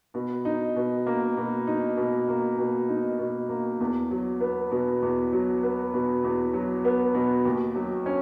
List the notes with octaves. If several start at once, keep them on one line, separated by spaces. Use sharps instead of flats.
B2
D#4
B2
A#3
B2
D#4
B2
A#3
B2
D#4
B2
A#3
E2
F#3
B3
B2
E2
F#3
B3
B2
E2
F#3
B3
B2
D#2
F#3
C#4